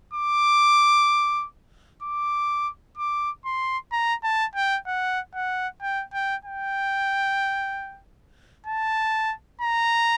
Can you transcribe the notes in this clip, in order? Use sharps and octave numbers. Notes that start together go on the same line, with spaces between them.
D6
D6
D6
C6
A#5
A5
G5
F#5
F#5
G5
G5
G5
A5
A#5